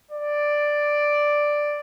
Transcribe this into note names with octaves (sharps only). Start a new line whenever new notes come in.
D5